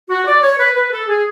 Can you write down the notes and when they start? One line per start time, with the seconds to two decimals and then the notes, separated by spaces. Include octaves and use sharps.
0.10 F#4
0.27 D5
0.43 C#5
0.59 B4
0.76 B4
0.92 A4
1.09 G#4